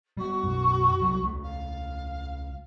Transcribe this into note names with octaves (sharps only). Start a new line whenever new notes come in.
G3 B3 F#4
F#2 B2
C2 F#3 G3
C#2 A3
F5